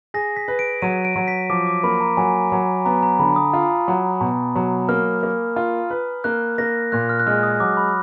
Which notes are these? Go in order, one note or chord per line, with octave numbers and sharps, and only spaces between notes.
G#4 A#6
B6
B4
D7
F#3 D#7
D7
F#3
B6
F3 D6
D6
A#3 B5
A#5
F#3 G#5
F#3
B3 A#5
A#5
D3 B5
D#6
F4
F#3
B2
F#3
A#3 F6
A#3
F4
B4
A#3 F#6
A#3 A#6
A#2 F#6
F6
F#6
G#3 F6
D#6
F#3 D6
B5